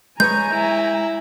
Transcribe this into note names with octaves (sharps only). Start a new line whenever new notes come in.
G#3 B4 C#5 G#5 A#5 G6
E4